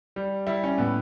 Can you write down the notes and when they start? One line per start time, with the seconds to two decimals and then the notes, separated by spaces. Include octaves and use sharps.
0.16 G3
0.47 G3 E4
0.64 C#4
0.78 A2 B3